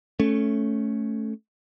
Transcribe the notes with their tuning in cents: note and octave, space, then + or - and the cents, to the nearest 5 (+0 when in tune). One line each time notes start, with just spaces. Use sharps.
A3 -5 C#4 +0